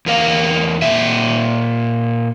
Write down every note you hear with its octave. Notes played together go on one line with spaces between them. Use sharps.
E2 A#4 F5
A#2 E5